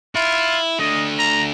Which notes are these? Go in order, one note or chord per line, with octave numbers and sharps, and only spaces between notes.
E4 F4
A3 D4 D#5
A#5